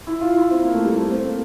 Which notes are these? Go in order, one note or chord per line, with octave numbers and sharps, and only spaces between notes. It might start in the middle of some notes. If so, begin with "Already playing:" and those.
E4
F4
E4
C4
A#3
A3
G3
A3
C4
A#3